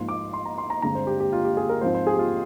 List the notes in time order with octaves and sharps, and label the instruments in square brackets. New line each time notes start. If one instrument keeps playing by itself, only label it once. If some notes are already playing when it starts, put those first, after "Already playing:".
Already playing: [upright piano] G#2 F3 A#3 C6
D6
C6
A#5
C6
A#5
G2 D3 G#3 C4 A#5
C5
G4
G4
F4
G4
G#4
A#4
G#2 F3 C4 C5
C5
G#4
G4
F4